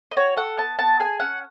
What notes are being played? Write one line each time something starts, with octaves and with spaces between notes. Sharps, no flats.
D#5
F#4 C#5
A4 F#5
B3 A5
B3 A5
G#4 G#5
C#4 F#5